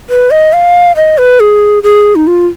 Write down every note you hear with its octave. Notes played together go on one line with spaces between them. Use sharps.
B4
D#5
F5
D#5
B4
G#4
G#4
D#4
F4